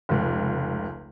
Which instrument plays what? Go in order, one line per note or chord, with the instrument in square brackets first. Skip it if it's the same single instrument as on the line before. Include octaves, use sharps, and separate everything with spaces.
[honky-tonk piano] F1 C#2